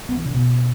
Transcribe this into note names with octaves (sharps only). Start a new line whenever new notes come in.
B3
E3
C#3
B2